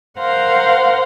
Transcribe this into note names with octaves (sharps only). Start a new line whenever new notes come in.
A#4 C5 F5 F#5 A#5 C6